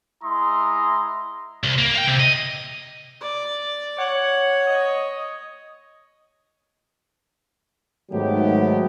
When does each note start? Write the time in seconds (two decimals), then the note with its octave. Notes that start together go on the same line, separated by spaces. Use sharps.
0.22 G#3 E4 A#5 C6 D#6
1.64 C2
1.79 A#3
1.95 F5 G5
2.08 C3
2.20 D#5
3.21 D5
3.99 C#5 F#5
4.67 D#5
8.12 G#2 D#3 F#3 A3 B3 G4